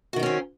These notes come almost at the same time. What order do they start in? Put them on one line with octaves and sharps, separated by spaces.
F#4 D#3 D#4 C#4 C4